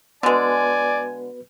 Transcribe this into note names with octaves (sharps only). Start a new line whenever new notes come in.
D3 G#3 B3 F#4 B4 D5 G#5